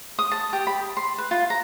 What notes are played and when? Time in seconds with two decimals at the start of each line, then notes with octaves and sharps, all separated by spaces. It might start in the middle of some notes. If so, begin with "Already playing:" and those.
0.19 D#6
0.31 A5
0.53 G4
0.67 B5
0.97 C6
1.18 B4
1.31 F4
1.50 A#5